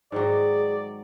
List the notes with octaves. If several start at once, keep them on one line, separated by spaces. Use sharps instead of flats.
G#2 D#3 F#3 G#4 D5